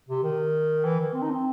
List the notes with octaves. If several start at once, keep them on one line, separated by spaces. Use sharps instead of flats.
C3
D#3
E3
D#3
C4
D#4
C4